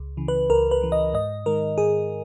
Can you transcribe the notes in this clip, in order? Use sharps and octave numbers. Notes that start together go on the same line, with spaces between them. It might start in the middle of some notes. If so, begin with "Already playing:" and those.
Already playing: C#2
C#3 E3
B4
C#2 A#4
B4
C#3 E3
D#5
G#2 D#5
D#3 G#3 A#4
G#2 G#4